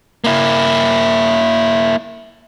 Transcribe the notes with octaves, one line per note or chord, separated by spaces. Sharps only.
A#3 E4